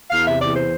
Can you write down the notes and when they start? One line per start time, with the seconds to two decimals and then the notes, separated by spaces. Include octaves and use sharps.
0.11 E2 F5
0.26 C3 E5
0.41 E2 D5
0.56 C5